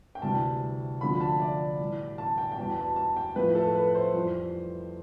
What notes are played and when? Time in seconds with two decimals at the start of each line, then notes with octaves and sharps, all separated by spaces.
0.15 G5
0.22 D2 C3 E3 G3 A5
1.01 D2 D3 F3 B5
1.20 A5
1.40 D5
1.79 A2 E3 G3
2.18 A5
2.38 G5
2.52 G5
2.57 E2 B2 G3 A5
2.78 A5
2.96 A5
3.16 G5
3.36 A2 F3 B4
3.55 A4
3.75 B4
3.95 C5
4.14 F2 E3 G3